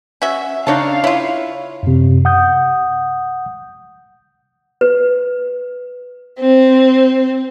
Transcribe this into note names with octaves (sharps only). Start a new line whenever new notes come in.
C#4 F#4 E5
C#3 D4 D#4 C#5 F5 A5
E4 F4 C#5
F#2 C3
F#5 D#6 G6
B4
C4